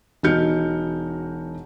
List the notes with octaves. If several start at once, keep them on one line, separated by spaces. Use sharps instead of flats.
E1 D#4 F#4 F6 G6 C#7